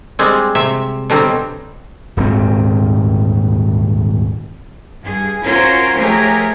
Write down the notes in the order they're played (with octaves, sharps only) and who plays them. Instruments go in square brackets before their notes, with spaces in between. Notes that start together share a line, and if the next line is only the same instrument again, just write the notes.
[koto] G3 G#3 C4
C3 E5
B2 D3 F#3 G3 C4
[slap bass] D#1 D2 G#2 C4
[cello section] G2 G#4
C#4 F4 F#4 A#4 C5 C#5
F3 A3 G4 G#4 A#4 C#5